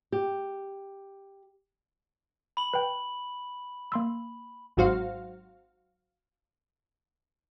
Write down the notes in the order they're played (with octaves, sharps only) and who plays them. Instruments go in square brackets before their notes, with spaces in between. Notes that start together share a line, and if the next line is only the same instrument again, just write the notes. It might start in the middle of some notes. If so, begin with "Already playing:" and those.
[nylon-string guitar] G4
[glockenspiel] B5 F#7
[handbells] B4 G5
A#3 C6 E6
[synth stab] G#1 G#2 F#3 F#4 C5 F5